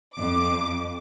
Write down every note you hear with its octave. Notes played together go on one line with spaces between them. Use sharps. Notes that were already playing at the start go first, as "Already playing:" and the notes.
F2 D6